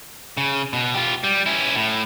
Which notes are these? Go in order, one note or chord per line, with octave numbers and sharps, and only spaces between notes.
C#3
B2
F4 G4
G3
C#4 E4
A2